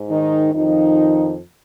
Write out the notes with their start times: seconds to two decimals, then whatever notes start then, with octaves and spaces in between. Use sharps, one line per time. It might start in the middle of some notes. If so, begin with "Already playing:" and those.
Already playing: G#2
0.10 D#3 D#4
0.54 F2 D#3 F3 D#4